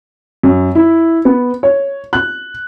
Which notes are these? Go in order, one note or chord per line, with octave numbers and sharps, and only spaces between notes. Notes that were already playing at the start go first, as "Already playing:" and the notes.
F#2
E4
B3
C#5
F#6